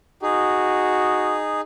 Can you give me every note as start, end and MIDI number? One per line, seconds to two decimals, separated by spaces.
0.22 1.61 63
0.22 1.39 66
0.22 1.61 68